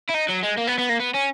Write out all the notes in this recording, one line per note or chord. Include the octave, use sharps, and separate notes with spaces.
E4
D#4
F#3
G#3
A#3
B3
B3
A#3
B3
C#4